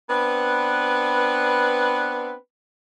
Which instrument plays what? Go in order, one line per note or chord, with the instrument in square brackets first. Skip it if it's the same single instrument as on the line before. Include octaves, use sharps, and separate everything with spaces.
[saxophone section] B3 C4 D4 B4